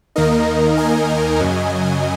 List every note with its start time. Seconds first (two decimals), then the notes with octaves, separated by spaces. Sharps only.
0.16 D#2 D#3 A#3 D#4 A#4 D#5
0.77 D#5 G#5
1.40 F#2 C#3 F#3